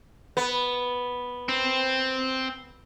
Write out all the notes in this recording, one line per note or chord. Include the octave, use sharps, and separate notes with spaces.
B3
C4